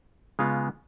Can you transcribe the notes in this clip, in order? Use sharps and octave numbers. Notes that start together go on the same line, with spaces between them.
C#3 G#3 B3 F4